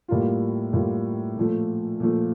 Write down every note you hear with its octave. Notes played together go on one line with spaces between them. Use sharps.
A2 G3 A#3 F4
A2 G3 A#3 F4
A#2 F3 A3
A#2 F3 A3